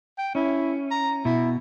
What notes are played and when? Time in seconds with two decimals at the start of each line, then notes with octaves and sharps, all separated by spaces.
0.18 G5
0.35 C#4 E4
0.91 A#5
1.25 B2 E4